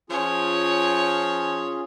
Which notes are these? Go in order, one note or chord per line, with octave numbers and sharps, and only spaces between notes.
F3 C#4 F4 G#4 C#5